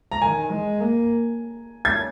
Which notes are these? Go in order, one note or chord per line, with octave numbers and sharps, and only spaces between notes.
A#5
D#3 G#5
G#3
A#3
G#6